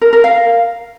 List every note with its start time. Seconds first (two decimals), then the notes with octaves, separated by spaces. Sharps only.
0.02 A#4
0.13 A#4
0.24 F5